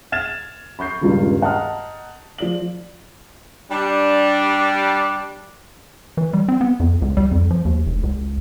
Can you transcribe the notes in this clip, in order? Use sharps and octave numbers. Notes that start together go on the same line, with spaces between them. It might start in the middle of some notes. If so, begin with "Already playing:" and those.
F6 G#6 A6 E7
B5 C#6 G6 C7
D#1 C#2 G2 F4
D#5 F#5 A5 A#5 D#6 F6
F3 D5 F#7
G3 D4
E3
G3
C4
B3
F2
C#2
G3
F2
F3
D#2
F1
C#2